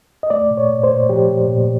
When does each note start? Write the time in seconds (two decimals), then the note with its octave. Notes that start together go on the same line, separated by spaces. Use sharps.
0.23 D#5
0.30 A3 D5
0.51 A#2
0.57 C#5
0.70 A#2
0.83 C5
0.89 A#2
1.09 F3 G4
1.28 A#2
1.48 A#2